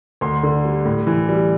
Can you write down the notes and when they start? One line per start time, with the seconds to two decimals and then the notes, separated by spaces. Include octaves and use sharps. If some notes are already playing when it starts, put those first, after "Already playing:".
0.21 D2 C6
0.43 D3
0.65 G3
0.85 A2
1.07 E3
1.29 G3